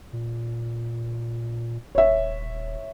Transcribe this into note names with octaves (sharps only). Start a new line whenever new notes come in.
A#2
D#1 C#5 E5